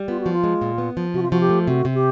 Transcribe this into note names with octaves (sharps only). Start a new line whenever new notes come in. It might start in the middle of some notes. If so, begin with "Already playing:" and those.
Already playing: G3
B3 F4
F#4
F3
F4
G#3
A#2
B3
F3
C3 F#4
F4
F3 F#4
G4
A3
C3 F#4
C3
G4